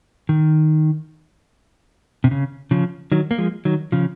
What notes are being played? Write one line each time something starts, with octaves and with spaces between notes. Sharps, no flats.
D#3
C3
C#3
C#3 F3
D#3 F#3
A#3
F3 G#3
D#3 F#3
C#3 F3